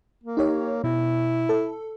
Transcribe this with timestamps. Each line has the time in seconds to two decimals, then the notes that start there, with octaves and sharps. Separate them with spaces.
0.24 A#3
0.37 D#4 G4 C#5
0.84 B2 E4
1.49 A4